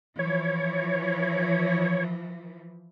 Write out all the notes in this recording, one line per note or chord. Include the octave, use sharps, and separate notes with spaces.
E3 F3 C#5